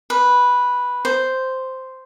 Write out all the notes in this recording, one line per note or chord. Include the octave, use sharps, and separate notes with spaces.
B4
C5